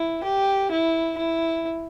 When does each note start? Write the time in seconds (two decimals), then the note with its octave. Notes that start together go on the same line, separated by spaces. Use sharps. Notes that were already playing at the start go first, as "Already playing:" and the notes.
Already playing: E4
0.24 G4
0.71 E4
1.17 E4